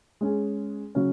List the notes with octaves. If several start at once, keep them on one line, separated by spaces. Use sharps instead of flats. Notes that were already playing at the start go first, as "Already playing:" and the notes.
G#3 C#4 G#4
C#3 F#3 C#4